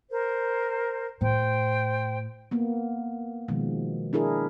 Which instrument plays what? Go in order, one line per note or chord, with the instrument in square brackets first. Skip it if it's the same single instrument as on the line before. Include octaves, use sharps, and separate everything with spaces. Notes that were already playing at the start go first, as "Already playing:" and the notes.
[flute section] A#4 C5
[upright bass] A2 [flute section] C5 G5
[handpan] A#3 B3
B2 D#3 F3 G#3
D4 E4 G#4 A#4